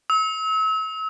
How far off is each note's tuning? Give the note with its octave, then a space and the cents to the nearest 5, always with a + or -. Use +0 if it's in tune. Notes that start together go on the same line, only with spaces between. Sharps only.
E6 -40